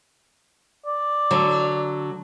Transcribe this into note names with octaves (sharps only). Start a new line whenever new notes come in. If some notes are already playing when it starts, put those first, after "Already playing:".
D5
D3 F#3